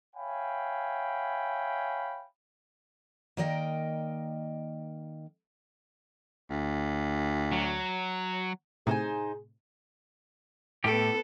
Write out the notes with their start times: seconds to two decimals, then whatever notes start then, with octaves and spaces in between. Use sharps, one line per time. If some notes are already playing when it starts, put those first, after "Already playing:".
0.15 C#5 E5 F5 G5 G#5 B5
3.37 D#3 A#3 A#4 D5 D#5 G5
6.50 D2
7.52 F#3
8.87 A2 C3 D#4 G#4 C5 G#5
10.84 A2 B3 G4 A4